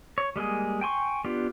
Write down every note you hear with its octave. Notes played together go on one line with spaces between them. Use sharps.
C#5
G3 G#3 A#3 G#4
G5 G#5 C6 C#6
B3 D4 F4 G4